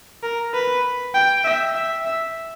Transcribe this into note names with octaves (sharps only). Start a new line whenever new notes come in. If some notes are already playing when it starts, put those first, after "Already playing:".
A#4
B4
G5
E5
E5
E5